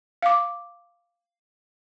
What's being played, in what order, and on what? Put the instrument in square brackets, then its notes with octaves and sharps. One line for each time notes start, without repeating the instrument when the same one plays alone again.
[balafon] F5 D6